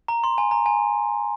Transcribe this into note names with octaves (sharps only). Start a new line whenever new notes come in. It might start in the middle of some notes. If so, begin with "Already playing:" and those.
A#5
C6
G#5
A#5
G#5